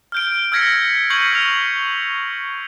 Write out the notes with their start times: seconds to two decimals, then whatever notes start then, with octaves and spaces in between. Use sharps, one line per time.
0.12 F6 G6 D7
0.52 E6 F6 G#6 A#6 B6 C#7
1.10 C#6 G6 G#6 C7 C#7 F#7
1.33 F6 C#7 F7